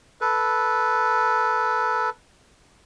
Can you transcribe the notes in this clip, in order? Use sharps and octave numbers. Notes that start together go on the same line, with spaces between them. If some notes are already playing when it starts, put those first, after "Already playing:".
A4 B4